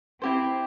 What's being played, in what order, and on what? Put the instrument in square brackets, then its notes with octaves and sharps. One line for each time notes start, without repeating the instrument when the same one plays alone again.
[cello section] C4 [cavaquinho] E4 G4 C5